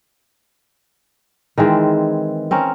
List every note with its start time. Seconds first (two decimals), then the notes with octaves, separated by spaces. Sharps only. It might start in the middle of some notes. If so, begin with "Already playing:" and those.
1.58 D#3 E3 G#3 C4
2.51 C4 C#4 A#4